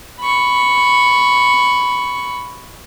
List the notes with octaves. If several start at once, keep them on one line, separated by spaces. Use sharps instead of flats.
B5 C#6